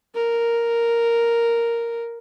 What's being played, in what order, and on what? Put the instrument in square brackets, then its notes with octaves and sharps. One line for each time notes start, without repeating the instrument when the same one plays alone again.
[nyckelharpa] A#4